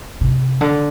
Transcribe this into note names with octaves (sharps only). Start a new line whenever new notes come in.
C3
D3